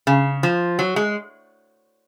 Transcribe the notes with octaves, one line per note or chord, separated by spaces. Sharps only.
C#3
F3
F#3
G#3